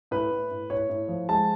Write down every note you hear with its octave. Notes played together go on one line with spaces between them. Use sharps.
A2 B4
A2
A2
A2 C#5
A2
F3
G#3 A5